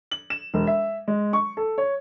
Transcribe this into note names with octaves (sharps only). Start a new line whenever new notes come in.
F#7
E7
E1
E5
G#3
C#6
A4
C#5